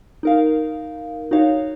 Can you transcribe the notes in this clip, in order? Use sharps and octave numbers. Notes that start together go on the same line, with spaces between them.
D#4 A#4 F5
D#4 F#4 C#5 F5